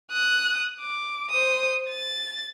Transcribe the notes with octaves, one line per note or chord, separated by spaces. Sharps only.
D#6 F#6
D6
C5 D#6
A6